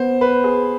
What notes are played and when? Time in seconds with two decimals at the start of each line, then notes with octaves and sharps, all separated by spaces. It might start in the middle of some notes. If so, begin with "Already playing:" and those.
Already playing: B3 C5
0.21 B4
0.44 G#4